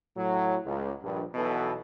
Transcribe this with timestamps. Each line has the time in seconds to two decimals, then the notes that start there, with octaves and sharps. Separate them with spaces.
0.17 A2 F#3
0.66 C#2
1.03 A#1 G2
1.35 B1 B2 E3 B3 A4